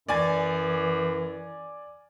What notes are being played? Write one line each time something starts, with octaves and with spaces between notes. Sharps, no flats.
F#2 E3 D5 G#5 A6